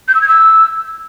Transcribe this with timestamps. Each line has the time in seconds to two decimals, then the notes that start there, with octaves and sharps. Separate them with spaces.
0.08 G6
0.15 E6
0.21 G#6
0.28 E6